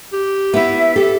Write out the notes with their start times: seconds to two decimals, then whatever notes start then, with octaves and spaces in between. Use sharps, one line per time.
0.13 G4
0.54 B3 E4 E5
0.96 G4 A4